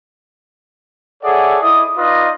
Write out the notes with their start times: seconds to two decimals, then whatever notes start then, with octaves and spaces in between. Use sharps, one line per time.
1.23 G#4 A4 C#5 D5 E5 F#5
1.62 E4 D5 D#5 D#6
1.98 D#4 F4 B4 D5 D#5